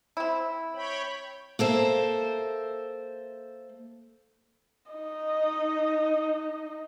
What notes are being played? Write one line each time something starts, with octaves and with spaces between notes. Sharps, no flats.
C4 E4
C#5 G5 B5
A#3 A4 C5 E5
D#4 D#5